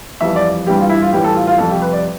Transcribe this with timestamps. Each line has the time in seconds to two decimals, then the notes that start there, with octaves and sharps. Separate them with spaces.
0.21 F2 E3 G3 E5
0.36 D5
0.67 G2 E3 G3 G4
0.78 F4
0.89 E4
1.02 F4
1.13 A2 E3 G3 G4
1.24 A4
1.36 F4
1.47 F4
1.58 F2 C3 G3 A4
1.71 G4
1.82 B4
1.93 D5